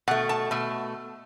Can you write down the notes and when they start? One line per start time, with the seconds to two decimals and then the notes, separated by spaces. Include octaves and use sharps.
0.08 B2 F#5
0.11 A3
0.29 A5
0.51 B2 A3